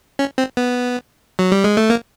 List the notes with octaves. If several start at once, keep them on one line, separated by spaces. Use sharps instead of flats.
C#4
C4
B3
F#3
G3
G#3
A3
A#3